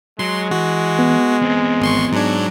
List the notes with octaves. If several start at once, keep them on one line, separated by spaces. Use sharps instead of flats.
F#3 G#3 C6
E3 F#4
B3
E2 C4
G#1 C6 C#6
G#2 F#3 D4